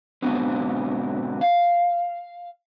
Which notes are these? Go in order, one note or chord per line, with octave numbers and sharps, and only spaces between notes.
G#2 B2 D3 F#3 B3 C4
F5